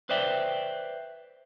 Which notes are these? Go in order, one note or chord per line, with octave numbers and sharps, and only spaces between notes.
B4 C5 D5 E5 G5